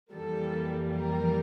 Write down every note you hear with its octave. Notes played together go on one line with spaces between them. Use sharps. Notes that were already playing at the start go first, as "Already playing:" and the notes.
F2 E3 G3 A#3 A4
A#4